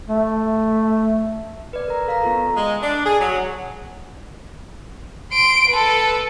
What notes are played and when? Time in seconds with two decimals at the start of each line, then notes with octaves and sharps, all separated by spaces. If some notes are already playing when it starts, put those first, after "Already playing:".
0.08 A3
1.73 B4 D5
1.88 A#4 A#5
2.06 A4 F5 A#5
2.22 B3 F4 A4
2.57 G#3
2.83 D4
3.06 G#4
3.21 F#3
5.33 C6 D7
5.69 A4 B4